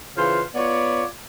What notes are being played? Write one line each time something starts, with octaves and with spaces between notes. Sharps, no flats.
C#3 E3 F4 B4 C5
B3 F4 C#5 D5